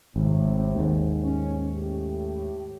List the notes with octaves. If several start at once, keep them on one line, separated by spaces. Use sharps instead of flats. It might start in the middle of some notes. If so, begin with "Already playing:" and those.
G#1 A2 C3
D#2 G#2
C#4
A2 G4